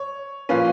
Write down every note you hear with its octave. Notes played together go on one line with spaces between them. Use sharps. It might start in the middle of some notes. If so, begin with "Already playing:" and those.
Already playing: C#5
A#2 F3 A#3 C#4 B4